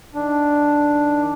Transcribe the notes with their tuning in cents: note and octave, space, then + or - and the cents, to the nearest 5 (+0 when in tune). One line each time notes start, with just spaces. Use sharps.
D#3 +0 D4 +0